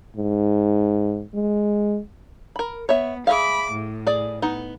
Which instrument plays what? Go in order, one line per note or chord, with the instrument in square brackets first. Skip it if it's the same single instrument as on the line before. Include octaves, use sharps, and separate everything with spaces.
[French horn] G#2
G#3
[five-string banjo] A#4 B5
[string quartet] B3 [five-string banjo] C#5 E5
[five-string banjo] G#4 E5 F5 [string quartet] B5 D6
[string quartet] A2
[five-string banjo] G#4 D5
B3 D#4